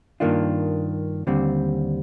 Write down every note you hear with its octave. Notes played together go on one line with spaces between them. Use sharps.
G2 D#3 A#3 D4 F4
D#2 D3 G3 C4